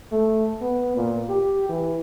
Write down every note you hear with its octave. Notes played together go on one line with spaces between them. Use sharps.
A3
B3
A#2
G4
E3